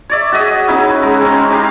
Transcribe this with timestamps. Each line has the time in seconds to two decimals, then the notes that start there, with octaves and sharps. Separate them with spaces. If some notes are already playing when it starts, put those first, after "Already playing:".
0.10 C#5 D5 E5
0.32 F#4 G#4 D#5 E5
0.68 C#3 B3 D#4 E4
1.02 G#3 A#5
1.21 C4 C#4
1.50 D#4 G4 F5